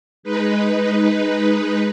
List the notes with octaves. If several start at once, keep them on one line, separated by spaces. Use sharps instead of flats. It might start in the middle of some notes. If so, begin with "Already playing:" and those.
G#3 D#4 B4